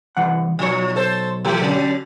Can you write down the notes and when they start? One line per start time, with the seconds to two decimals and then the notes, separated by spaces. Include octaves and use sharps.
0.17 C2 E3 F#5
0.59 B1 F3 C#5
0.96 A4 C5
1.45 E3 A3 G4
1.62 D3 F#3 C#4